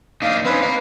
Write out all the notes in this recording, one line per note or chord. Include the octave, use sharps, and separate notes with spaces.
A#3 D4 D#4 F5
C4 C#4 D#4 B4
F5 A#5